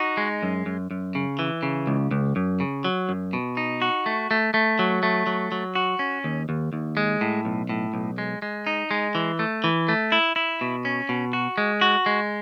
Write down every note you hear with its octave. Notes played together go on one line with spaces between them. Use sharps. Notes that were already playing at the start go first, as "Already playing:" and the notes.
Already playing: D#4 F#4
G#3
F#2
F#2
F#2
C#3
E3
C#3
C#2
C#2
F#2
C#3
F#3
F#2
B2
D#4
F#4
A3
A3
A3
F#3
A3
F#3
F#3
F#4
C#4
D#2
D#2
D#2
G#3
A2
B1
A2
B1
G#3
G#3
D#4
G#3
E3
A3
E3
A3
E4
E4
B2
C#4
B2
F#4
G#3
F#4
G#3